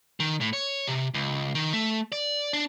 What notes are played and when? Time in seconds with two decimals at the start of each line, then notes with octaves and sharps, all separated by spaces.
0.20 D#3
0.41 A2
0.53 C#5
0.87 C3
1.14 C#2
1.55 D#3
1.73 A3
2.12 D5
2.53 D4